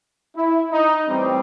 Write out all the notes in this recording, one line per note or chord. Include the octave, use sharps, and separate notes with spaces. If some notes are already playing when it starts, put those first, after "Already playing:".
E4
D#4
A2 E3 G3 C4